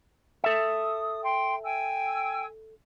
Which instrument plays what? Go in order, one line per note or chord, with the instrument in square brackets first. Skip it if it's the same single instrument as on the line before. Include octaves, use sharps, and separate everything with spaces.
[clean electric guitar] A4 E5 [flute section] D#6
[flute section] G5 C6
G5 G#5 E6